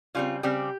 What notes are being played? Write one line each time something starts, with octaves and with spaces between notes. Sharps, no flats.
C#3 G3 C4 F4
C#3 G3 C4 G4